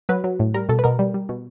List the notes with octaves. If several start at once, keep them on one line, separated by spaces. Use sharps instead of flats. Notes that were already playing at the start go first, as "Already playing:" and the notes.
F#3 B4
F#3
A2
G3 A#4
B2 A4
B4
B2 A#4
G3
G3
B2